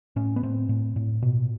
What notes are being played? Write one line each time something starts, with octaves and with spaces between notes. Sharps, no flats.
A2 C#4
B3
A2 C4
A2
A2
B2